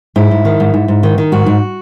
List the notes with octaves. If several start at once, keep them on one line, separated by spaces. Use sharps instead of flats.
G#2 E4
G#2
D#3
G#2
G#2
G#2
D#3
D#3
G#2 F#4
G#2